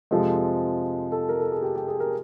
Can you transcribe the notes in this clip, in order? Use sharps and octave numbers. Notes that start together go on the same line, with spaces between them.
F2 C3 F3 G#3 A4
A4
A#4
A4
G#4
G4
G4
G#4
A#4